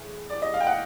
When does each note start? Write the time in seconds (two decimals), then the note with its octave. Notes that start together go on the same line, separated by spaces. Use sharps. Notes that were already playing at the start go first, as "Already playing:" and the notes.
Already playing: A2 E3 G#3
0.30 D5
0.42 D#5
0.54 F5
0.61 G5
0.67 F#5